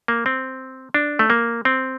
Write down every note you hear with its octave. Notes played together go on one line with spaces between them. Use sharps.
A#3
C4
D4
A3
A#3
C4